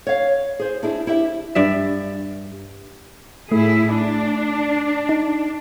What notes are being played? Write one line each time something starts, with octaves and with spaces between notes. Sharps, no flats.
C#5 F5
G#4 C5
D4 E4 G#4
E4 G4 E5
G2 D5 E5
A2 A3 E4 G#4
D4
D#4